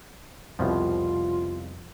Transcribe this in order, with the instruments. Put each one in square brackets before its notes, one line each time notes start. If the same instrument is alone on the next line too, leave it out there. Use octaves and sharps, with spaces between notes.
[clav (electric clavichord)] C2 B2 F3 [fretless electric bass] F2 [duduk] F4